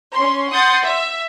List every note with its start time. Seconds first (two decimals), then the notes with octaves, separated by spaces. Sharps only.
0.14 C#4 C6
0.50 F#5 C6 D#6 G6 A6
0.85 E5